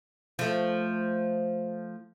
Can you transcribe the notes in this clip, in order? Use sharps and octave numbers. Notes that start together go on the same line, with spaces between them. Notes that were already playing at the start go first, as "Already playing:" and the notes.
F3 A3